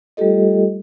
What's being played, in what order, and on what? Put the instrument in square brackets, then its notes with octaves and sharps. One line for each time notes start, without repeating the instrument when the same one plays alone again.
[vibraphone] G3 A3 F4 G4 A4 D#5